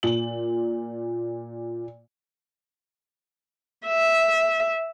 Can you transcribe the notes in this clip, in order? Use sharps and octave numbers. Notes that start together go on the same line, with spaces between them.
A#2 F#7
E5